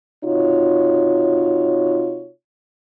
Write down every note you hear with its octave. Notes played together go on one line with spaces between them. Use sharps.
C3 D#4 F4 F#4 C#5